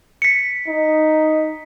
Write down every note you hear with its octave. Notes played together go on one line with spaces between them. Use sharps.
B6 C#7
D#4